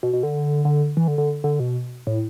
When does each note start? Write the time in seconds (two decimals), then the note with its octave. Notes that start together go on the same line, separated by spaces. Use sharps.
0.03 B2
0.13 B2
0.23 D3
0.65 D3
0.97 E3
1.08 D3
1.18 D3
1.44 D3
1.60 B2
2.07 A2